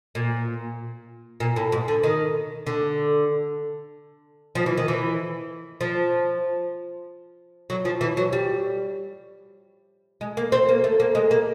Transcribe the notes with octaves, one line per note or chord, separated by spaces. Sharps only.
A#2
A#2
A2
G#2
D3
D#3
D3
F3
E3
D#3
E3
F3
F#3
F3
E3
F#3
G3
G#3
A#3
C4
A#3
A3
A#3
G#3
A#3